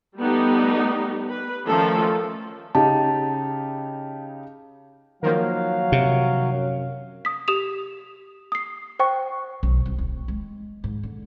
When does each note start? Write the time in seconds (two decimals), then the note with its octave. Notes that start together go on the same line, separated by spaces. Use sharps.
0.18 G3 A3 B3 D#4 G4
1.29 B4
1.65 D#3 F3 A3 C#4 F4 A4
2.75 C#3 D#4 G4 A5
5.23 D#3 F3 F#3 A#3 F5
5.92 C3
6.53 F#2
7.25 D#6 B6
7.48 G4 D#6 E7 F7
8.52 D#6 C7
8.99 C5 G5 C#6
9.63 B1
9.86 C2
9.98 D1
10.28 G#3
10.84 G#2
11.03 D3